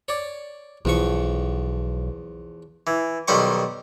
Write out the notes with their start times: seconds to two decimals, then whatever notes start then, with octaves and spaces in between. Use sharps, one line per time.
0.08 C#5 D5
0.85 B1 E2 F3 C#6
2.87 E3
3.28 B1 D#3 G3 C5 F#5 C#6